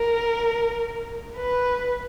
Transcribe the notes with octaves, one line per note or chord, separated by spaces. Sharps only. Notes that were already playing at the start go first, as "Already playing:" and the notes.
Already playing: A#4
B4